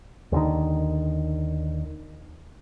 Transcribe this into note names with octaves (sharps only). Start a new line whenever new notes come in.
D#2 D3 D#3